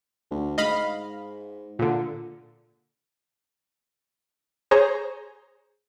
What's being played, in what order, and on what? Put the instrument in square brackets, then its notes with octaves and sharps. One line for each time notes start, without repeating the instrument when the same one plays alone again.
[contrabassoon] D2
[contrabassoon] G#2 [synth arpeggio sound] D#5 F5 B5
[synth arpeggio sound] A#2 D3
[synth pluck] G#4 C5 C#5 G#5 A#5